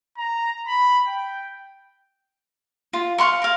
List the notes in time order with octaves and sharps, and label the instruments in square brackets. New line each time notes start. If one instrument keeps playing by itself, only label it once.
[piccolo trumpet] A#5
B5
G5
[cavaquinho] F4
F5 F#5 C6 C#6
A#4 F5